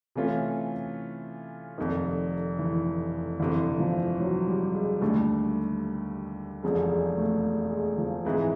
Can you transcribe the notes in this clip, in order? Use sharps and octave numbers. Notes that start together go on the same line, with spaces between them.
C3 E3 A3 C#4 F4
F1 F2 C3 D#3
E3
G1 F2 C3 E3
F3
F#3
G3
G#3
D#2 D3 G3 A3
F1 E2 C#3 F3 G#3
G#3
A3
G#3
F3
G#2 E3 G#3 C4 E4